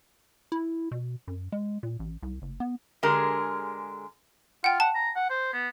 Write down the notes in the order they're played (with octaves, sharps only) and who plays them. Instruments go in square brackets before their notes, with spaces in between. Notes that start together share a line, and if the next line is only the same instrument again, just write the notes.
[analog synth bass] E4
B2
F#2
G#3
A#2
A1
C2
F#1
B3
[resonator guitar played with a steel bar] D3 G#3 G4 G#4 A#4
[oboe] F4 [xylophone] F#5 G5
[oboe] F#5 [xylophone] A5
[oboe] A#5
F#5
C5
B3